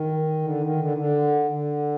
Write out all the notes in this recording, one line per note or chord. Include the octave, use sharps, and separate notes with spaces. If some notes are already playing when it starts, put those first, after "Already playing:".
Already playing: D#3
D3
D#3
D3
D3
D3